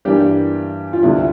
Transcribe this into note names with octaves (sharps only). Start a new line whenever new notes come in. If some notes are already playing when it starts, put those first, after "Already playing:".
G2 E3 G3 A#3 D4 G4
F4
D2 C3 G3 E4